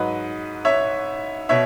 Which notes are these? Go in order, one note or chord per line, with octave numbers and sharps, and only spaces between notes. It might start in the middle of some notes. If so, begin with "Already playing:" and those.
Already playing: G#2 F#3 B4 D#5
C#5 E5
B2 C#5 E5